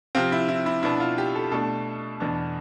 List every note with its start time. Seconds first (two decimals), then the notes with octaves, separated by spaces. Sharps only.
0.15 C3 F3 C4 F4
0.32 E4
0.48 E4
0.66 E4
0.83 B2 B3 D4 E4
1.00 F4
1.18 G4
1.35 A4
1.52 B2 A3 D4 A4
2.20 E2 B2 B3 D4